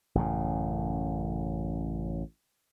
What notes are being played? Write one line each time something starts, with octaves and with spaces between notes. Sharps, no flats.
A1 F#2 C#3